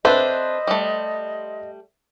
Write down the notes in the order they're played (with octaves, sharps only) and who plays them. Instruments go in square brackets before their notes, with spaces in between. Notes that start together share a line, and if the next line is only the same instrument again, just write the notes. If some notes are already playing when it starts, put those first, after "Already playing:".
[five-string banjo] C4 D4 A4 [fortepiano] B4 C5 E5 [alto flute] D#5
[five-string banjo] G3 A3